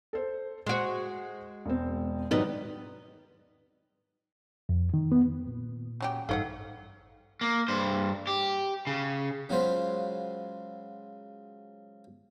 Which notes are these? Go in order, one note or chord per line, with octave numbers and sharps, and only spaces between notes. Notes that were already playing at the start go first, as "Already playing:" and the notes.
A4 C5
G#3 F#4 C5 C6
E1 C4
G#2 D#3 F#3 G3 D#4 B4
F2
D#3
B3
A#2
C#3 F#3 G4
A1 G2 D#4 G#4 A4 C#5 F5 F#5
A#3
G2 C5
G4
C#3
C#3 F#3 G#3 F4 C5 B5